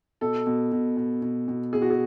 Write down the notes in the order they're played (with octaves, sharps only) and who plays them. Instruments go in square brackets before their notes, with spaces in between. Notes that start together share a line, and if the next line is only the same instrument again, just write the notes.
[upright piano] B2 A4
B2
B2
B2
B2
B2
B2 G#4
F#4
G#4